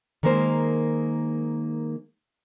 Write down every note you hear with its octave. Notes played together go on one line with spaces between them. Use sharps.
D#3 G#3 A#3 A#4 C5